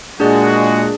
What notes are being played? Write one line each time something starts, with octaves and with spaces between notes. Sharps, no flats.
A#2 G#3 D4 F#4 G#4 D5